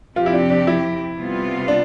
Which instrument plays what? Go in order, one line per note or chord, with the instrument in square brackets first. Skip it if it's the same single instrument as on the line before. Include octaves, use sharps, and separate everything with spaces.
[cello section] F2 C3 F3 C4 G4 [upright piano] F4
[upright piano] E4
D4
D4
E4
[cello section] C3 G3 B3 F4
[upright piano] D4